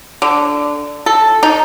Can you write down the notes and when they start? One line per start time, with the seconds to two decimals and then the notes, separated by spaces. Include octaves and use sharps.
0.22 D3
1.06 A4
1.43 D#4